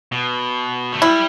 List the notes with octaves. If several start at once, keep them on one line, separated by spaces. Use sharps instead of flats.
B2
A3
G3 E4